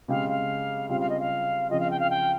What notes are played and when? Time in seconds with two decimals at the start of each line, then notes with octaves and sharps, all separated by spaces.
0.08 C#3 G#3 C4 G4 F5
0.29 F5
0.90 C#3 G3 C4 F4 F5
1.00 F5
1.09 D#5
1.19 F5
1.69 C#3 F3 C4 F4 D#5
1.80 F5
1.90 G5
1.99 F5
2.10 G5